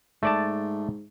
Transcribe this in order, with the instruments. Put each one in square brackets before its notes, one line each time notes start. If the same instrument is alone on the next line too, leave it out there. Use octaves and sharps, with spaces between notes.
[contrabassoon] G#2 [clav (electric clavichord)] A3 D5 A5